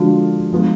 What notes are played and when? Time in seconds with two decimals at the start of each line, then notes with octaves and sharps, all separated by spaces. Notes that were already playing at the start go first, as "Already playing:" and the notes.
Already playing: D3 F3 G#3 D4 F4 F#4
0.53 F3 G#3 B3 F4